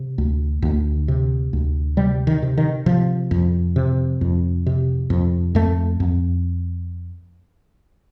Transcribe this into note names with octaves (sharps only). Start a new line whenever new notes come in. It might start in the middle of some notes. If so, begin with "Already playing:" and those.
Already playing: C3
D2
D2
C3
D2
C3 G3
D#3
C3
D#3
C3 F3
F2
C3
F2
C3
F2
F2 A3
F2